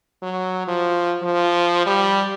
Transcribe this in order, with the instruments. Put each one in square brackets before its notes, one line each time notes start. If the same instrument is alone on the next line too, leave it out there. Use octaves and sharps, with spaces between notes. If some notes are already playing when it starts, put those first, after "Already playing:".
[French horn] F#3
F3
F3
G3